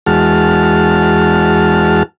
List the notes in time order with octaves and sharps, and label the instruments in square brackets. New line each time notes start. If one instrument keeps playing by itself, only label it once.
[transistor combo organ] E2 G#3 F#4 A5 F6